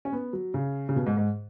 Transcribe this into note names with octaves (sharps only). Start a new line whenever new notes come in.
C#4
B3
F#3
C#3
C#3
B2
G#2
G#2